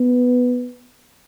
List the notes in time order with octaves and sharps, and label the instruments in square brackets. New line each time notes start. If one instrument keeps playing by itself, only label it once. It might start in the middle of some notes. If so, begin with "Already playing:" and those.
Already playing: [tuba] B3